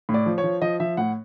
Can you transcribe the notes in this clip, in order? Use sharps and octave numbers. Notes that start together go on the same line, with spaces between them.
A2
D5
F3
C#5
F3
F3 D#5
F3 E5
A2 F#5